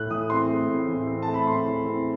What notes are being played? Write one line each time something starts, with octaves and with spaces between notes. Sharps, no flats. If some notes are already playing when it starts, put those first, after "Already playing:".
Already playing: A2 A3 F#6
E3 D#6
C4 C6
A3
A2
E3
C4
A5
A3
B5
A2 C6
E3
C4